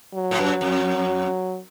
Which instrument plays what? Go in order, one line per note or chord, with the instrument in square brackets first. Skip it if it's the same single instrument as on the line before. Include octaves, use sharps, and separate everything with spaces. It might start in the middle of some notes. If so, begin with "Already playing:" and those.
[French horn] F#3
[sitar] A2
F#2
F2